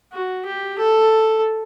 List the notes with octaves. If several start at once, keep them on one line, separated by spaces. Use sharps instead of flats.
F#4
G4
A4